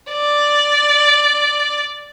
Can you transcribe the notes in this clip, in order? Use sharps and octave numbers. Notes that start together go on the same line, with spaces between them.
D5